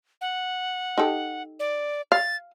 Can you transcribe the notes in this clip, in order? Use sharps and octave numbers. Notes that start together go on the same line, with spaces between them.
F#5
D#4 G4 A4
D5
F5 A6